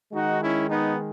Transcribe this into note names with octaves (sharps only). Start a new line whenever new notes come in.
D#3 G#3 D#4 F#4
C#4 E4
B3 D#4